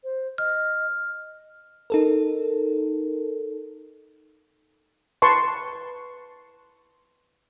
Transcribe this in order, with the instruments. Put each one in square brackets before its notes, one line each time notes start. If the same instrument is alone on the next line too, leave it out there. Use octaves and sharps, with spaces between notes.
[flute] C5
[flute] D#5 [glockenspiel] F6
[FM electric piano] D#4 A4 A#4
[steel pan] B4 A5 C6 C#6